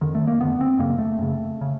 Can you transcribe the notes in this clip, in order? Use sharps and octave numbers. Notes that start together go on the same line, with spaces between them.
F2 D3 D#3
A3
A#3
F2 D3 B3
C4
F#2 C#3 A#3
A3
F#2 C#3
C#3